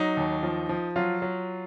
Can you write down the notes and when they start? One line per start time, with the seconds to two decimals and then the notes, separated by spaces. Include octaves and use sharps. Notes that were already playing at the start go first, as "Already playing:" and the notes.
Already playing: F#3 D#4
0.17 D#2
0.43 F3
0.69 F3
0.96 F#3 F4
1.22 F#3